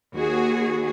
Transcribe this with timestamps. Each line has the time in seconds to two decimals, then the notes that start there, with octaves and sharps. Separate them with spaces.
0.14 D#2 F#4 G#4